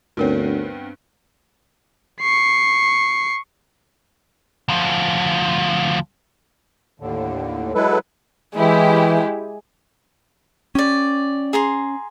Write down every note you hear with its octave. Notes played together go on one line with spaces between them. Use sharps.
D2 G2 B3 C4 D#4 A#4 C#5
C#6 C7
D2 F3
D#2 A2 D3
F#3 G#3 E4 A4 B4
E3 G#3 E4 G4
C#4 G4 D5
G#4 A#5 C6